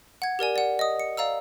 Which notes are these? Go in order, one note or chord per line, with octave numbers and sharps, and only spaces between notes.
F#5 G#6
G4 A#4 D5 G#5
D5 F#5
D#5 D#6
C#7
D5 F5 A#5 E6